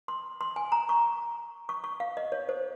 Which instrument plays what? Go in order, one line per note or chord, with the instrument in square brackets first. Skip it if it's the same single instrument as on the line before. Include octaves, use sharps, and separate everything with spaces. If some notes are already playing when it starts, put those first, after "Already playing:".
[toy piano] C6
C6
G#5
A#5
C#6
C#6
C#6
F5
D#5
C#5
C5